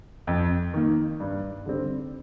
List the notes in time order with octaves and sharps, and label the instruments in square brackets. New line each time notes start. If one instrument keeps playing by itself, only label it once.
[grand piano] F2
D#3 A#3
G2
D3 G3 C4